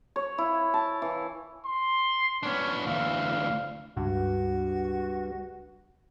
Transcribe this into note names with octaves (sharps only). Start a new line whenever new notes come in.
C#5
E4
A5
E3
C6
B3 C#4 D4
D2 E3 F5
C#2 G2 F#4